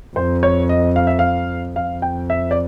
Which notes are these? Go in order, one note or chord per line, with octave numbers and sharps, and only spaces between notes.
F2 C5
C#5
D#5
F5
E5
F5
F2 F5
G5
E5
D5